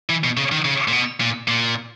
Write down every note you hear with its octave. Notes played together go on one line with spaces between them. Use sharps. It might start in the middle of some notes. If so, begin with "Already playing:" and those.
E3
B2
C#3
D#3
C#3
A#2
B2
A#2
A#2